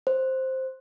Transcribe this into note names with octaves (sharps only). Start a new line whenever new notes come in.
C5